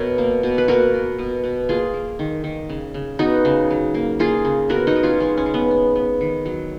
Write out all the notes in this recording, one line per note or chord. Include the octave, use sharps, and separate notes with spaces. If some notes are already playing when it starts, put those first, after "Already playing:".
Already playing: B2 A#4 C#5
A#3
B2
B4
A#3 F#4 A#4
B2
B2
B2
A#3 F4 G#4
A#3
D#3
D#3
C#3
C#3
B3 D#4 F#4
C#3
F#3
A#3
A#3 F4 G#4
C#3
B3 F#4 A#4
D#4 F#4
B3
C#4 F4
G#3 C#4
C#4
C#3
B3
B3
B3
D#3
F#3